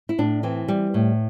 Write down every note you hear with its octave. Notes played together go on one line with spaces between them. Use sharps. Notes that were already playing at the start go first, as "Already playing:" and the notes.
E4
A2 D4
E3 C4
G3
A2